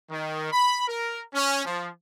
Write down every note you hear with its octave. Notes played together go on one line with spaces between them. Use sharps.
D#3
B5
A#4
C#4
F3